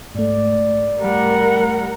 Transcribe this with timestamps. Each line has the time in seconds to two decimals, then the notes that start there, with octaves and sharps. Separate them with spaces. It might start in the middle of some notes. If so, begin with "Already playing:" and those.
0.15 G#2 A3 D5
1.01 G3 A#4 F#5